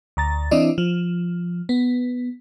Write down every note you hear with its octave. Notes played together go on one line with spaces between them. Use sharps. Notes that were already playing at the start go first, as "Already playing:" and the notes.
D2 A#5 A6
E3 C4 D4 E4 D5 D#5
F3
B3